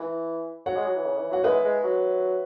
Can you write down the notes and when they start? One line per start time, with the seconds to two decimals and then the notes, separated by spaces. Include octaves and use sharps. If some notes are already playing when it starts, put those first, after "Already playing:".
Already playing: E3
0.66 F#3 C#5 F#5
0.76 G#3
0.85 F#3
0.95 E3
1.05 C#3
1.18 E3
1.31 F#3 F#5
1.44 G#3 B4 E5
1.64 G#3
1.84 F#3